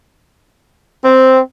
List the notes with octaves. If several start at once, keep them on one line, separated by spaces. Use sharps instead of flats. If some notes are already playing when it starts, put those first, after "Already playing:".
C4